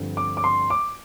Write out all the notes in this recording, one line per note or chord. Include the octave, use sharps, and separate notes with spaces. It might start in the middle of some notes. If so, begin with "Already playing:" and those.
Already playing: G2 D3 F3 C4
D6
D6
C6
D6